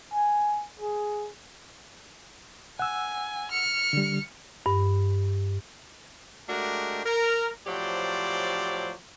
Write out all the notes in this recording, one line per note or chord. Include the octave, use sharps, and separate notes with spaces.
G#5
G#4
F#5 G#5 E6
F6 C#7
D3 G3
G2
G#3 A3 D4 F#4 G4 A#4
A#4
A2 F3 F#3 G4 C5 D5